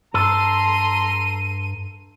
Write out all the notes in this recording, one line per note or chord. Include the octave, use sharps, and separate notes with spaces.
G2 A4 A#5 C6 D#7